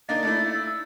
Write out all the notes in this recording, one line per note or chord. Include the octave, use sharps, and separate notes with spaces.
A#3 D4 D#4 A6
A3 D4 E4
E6
E6